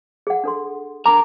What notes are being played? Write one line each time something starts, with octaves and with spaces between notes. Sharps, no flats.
G#4 F#5
D4 A4 C6
D4 A#4 A#5 D6